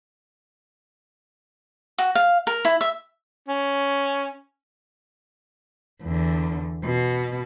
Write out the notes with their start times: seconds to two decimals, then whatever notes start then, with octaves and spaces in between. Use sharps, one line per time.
1.98 F#4
2.15 F5
2.47 A#4
2.65 E4
2.81 E5
3.48 C#4
6.03 E2 D3
6.85 B2